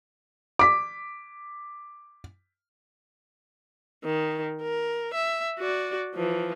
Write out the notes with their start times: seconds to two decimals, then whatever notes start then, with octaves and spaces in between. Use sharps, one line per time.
0.59 D6 B6
4.04 D#3
4.62 A#4
5.14 E5
5.59 F#4 D5
6.15 E3 F3